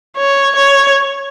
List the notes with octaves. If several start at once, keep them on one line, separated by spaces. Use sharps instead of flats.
C#5
C#5